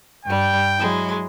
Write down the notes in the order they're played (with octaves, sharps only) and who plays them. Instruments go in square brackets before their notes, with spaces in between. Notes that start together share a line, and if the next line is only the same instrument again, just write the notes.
[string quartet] G2 G3 [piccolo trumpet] G5
[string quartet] F#3 G#3 E4